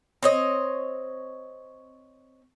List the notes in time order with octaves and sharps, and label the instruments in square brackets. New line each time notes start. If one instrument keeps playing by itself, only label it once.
[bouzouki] C4 C#5 D#5